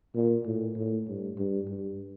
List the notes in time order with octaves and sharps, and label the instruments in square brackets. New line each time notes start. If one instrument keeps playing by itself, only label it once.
[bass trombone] A#2
A2
A2
G2
G2
G2